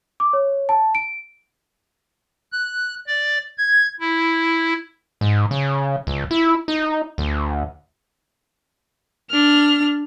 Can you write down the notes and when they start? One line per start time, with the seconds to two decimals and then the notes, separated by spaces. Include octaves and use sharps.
0.20 D6
0.33 C#5
0.69 A5
0.95 D7
2.52 F#6
3.07 D5
3.58 G#6
4.00 E4
5.21 G#2
5.51 C#3
6.07 C#2
6.31 E4
6.68 D#4
7.18 D2
9.30 D4 F6